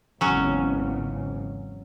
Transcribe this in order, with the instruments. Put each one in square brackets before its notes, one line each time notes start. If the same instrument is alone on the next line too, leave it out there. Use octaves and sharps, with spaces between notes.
[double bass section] G#1 E2 C#3 [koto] F#3 C#4